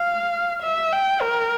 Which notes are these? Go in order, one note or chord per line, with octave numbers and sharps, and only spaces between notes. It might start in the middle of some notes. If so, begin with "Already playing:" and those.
Already playing: F5
E5
G5
A#4